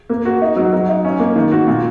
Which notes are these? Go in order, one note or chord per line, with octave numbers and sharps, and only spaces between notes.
A#3
F#4
D#4
F#3
F#3
D#4
C#4
A#3
D#3
F#4
A#2